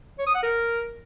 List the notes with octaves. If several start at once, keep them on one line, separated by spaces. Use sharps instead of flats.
C#5
D#6
F#5
A#4